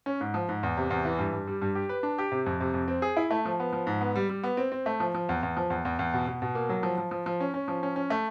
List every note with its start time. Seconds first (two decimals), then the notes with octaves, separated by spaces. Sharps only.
0.06 C#4
0.21 G#2
0.34 F3
0.49 G#2
0.63 E2
0.77 C3
0.90 E2
1.05 E3
1.19 G2
1.33 G2
1.47 G3
1.61 G2
1.75 G4
1.89 B4
2.03 D4
2.18 G4
2.32 C3
2.46 F2
2.60 C3
2.74 F2
2.88 C4
3.02 G#4
3.17 E4
3.31 A3
3.45 F3
3.60 B3
3.73 F3
3.87 G#2
4.01 B3
4.16 G3
4.29 G3
4.43 B3
4.57 C4
4.72 C4
4.86 A3
5.00 F3
5.15 F3
5.29 E2
5.43 E2
5.57 F3
5.70 E2
5.85 E2
5.99 E2
6.14 B2
6.27 B2
6.42 B2
6.55 A#3
6.69 F#3
6.83 F3
6.98 F3
7.11 F3
7.26 F3
7.40 C#4
7.54 C#4
7.68 F3
7.83 C#4
7.96 C#4
8.10 A3